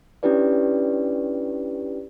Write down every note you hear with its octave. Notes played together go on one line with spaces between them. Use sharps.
C#4 D4 E4 G4 B4 D5